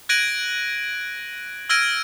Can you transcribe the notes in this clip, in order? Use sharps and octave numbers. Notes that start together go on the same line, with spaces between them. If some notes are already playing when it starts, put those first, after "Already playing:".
F#6 G#6 A#6 D7 D#7 F#7
E6 F6 G#6 A#6 D7 D#7